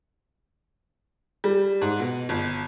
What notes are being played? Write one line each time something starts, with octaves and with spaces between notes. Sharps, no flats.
G3
G#2
B2
G1